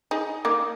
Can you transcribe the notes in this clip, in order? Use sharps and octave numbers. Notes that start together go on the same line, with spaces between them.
D#4 G#4
A#3 D#4